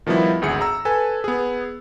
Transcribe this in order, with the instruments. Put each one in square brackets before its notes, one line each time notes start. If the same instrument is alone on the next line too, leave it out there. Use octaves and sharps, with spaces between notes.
[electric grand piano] D#3 F3 G3 B3 E4
G#1 D2 G#4 C#7
A#5 E6
A4 B4 G#5
B3 G#4